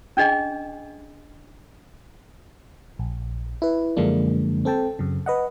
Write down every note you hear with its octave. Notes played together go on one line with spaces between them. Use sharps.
C#4 D4 G#4 D#5 G#5
A#1
E4 B4
F#2 D3 F3 G#3 A#3 D4
C4 A4 G5 A5
F#2 C#3
B4 D#5 F#5